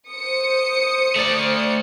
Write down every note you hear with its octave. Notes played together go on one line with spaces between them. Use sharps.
C5 D#6 C#7
A3 D5